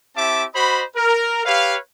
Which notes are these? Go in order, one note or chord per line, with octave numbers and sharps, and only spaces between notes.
C4 E4 G4 E5 A5 D6
F#4 C5 D#5 B5
A#4
G4 B4 C#5 F5